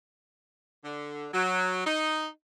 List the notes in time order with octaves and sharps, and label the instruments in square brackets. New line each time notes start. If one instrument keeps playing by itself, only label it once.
[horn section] D3
F#3
D#4